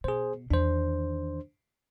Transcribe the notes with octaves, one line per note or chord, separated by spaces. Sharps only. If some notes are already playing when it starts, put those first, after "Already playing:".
B2 G#4 C5
E2 D#3 D4 C5